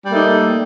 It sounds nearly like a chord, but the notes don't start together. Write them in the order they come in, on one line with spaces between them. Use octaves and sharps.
G3 A#3 A3 D#4